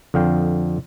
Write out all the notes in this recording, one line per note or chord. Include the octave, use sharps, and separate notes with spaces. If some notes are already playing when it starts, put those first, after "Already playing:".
F2 D3 F5 G5